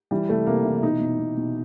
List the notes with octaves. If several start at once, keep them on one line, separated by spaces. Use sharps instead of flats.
E3 G3
C3 A3
C3 A#3
E3
B2 D#4
B2
B2
B2